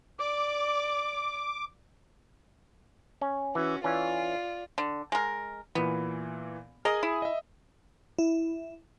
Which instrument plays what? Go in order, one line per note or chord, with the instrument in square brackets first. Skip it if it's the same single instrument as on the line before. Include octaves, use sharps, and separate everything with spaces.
[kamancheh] D5 [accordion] D6
[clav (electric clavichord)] C#4
[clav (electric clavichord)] E3 [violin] C#4 F#4
[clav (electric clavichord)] E3 C#4 [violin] F4 D5
[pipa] D3
G#3 A#4
[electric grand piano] A#2 E3 [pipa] B3
[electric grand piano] G#4 G#5 D#6 [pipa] A#4 D#5
[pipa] E4
[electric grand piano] D#5 E5
[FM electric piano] E4